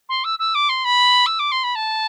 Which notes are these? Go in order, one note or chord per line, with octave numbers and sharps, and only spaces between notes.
C6
E6
E6
D6
C6
B5
E6
D6
C6
B5
A5